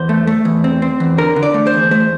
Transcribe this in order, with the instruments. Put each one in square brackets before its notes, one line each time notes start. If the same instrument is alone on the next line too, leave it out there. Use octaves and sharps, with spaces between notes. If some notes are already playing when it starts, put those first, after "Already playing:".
Already playing: [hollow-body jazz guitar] E2 C5
A3
A3
E2
C4
C4
E2
D3 A#4
D3
D5
A3
C5
E2
A3 C5